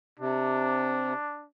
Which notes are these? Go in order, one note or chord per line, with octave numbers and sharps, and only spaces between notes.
C3 D4